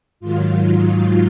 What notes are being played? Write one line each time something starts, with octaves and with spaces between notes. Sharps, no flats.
G#2 D#3 F#3 F4